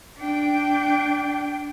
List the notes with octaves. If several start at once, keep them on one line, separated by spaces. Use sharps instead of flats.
D4 G5